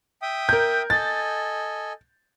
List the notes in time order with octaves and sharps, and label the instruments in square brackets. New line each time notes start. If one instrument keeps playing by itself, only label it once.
[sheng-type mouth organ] E5 G5 D#6
[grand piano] A#4 G6
[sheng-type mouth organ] A4 D#5 G#5 [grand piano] A6